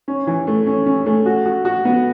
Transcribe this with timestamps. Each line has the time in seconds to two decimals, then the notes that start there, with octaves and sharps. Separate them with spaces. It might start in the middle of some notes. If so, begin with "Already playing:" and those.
0.08 C#4
0.27 E3
0.47 A3
0.67 C#4
0.86 C#4
1.06 A3
1.26 F#4
1.46 F#4
1.65 F#4
1.85 B3